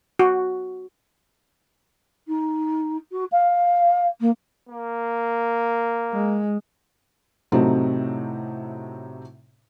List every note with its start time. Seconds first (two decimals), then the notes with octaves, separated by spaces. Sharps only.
0.19 F#4
2.27 D#4
3.11 F#4
3.31 F5
4.20 A#3
4.69 A#3
6.13 G#3
7.52 A2 C3 F#3 A3 C4 D#4